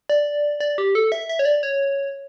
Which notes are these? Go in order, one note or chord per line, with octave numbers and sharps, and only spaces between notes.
D5
D5
G4
A4
E5
E5
C#5
D5
C#5